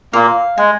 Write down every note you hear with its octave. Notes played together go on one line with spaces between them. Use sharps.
A#2 A#3 F5
G#3 G#5